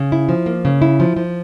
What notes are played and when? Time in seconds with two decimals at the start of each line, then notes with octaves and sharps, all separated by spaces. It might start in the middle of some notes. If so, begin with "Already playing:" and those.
Already playing: C#3
0.12 E4
0.29 F3
0.46 A#3
0.65 C#3
0.82 E4
1.00 F3
1.16 F3